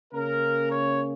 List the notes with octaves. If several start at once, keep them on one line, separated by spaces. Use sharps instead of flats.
C#3 A#3 C#4 A#4
C#5